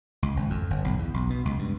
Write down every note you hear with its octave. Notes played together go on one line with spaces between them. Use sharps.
C#2
G#1
F2
G1
B1
E2
B1
B2
C#2
G2